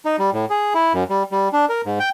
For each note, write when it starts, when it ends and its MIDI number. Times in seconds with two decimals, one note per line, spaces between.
0.05 0.16 63
0.19 0.30 55
0.33 0.45 45
0.50 0.73 68
0.75 0.93 64
0.94 1.04 42
1.10 1.23 55
1.32 1.48 55
1.53 1.65 62
1.69 1.82 70
1.85 1.99 44
2.00 2.09 79